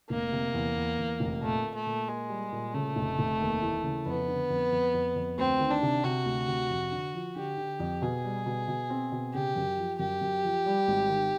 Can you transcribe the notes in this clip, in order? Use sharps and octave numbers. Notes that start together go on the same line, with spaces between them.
F1 A#3
C3
E2
E2
E2
F1
A#2 A3
A#2
A3
A#2
G#3 A#3
G3
A#2
C#3 A3
F1
F1
D#2
E3
C#3
F2 B3
D3
F2
F2
F2
F2
D2 C4
D#3
D4
C3
C3 F#4
D2
C3
F2
D3
F3
D3 G4
D3
F2
B2 G#4
G3
B2
B2
C4
B2
C#3 G4
F#2
F3
F#2 G4
F#2
F3
G3
G#1
D#3